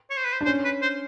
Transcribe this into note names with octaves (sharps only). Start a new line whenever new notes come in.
C#5
C5
B4
C5
D4
C#4 C5
B4
C5